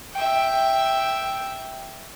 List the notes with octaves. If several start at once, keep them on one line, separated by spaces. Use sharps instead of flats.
E5 G5